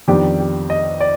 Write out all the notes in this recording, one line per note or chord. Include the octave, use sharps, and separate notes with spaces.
F2 D#3 B3 D4 G4
G4
D#5
D5